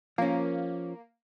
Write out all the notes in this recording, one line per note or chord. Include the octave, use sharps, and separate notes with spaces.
F3 A#3 C#4